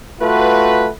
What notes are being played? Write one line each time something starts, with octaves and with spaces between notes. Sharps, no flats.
A3 F4 F#4 B4